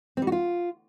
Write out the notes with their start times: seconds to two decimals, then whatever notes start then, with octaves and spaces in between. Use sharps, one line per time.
0.17 C4
0.22 G3
0.27 F#4
0.32 F4